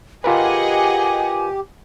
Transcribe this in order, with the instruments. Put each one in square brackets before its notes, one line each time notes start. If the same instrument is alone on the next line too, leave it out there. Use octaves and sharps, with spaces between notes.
[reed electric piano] F4 A#4 B4 [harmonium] G4 [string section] G#4 D#5 F#5 [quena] G#5